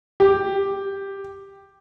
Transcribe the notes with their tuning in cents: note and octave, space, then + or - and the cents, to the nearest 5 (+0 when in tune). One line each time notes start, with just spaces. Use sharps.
G4 +5